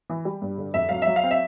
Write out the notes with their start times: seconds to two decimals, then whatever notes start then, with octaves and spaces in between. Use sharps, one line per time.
0.10 E3
0.25 G3
0.42 G2
0.58 D3
0.74 F2 E5
0.89 F#3 F5
1.02 E5
1.07 F#3
1.16 F5
1.23 C4
1.31 E5